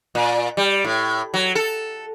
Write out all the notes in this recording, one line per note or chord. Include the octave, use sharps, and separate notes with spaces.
A#2
G3
A2
F#3
A4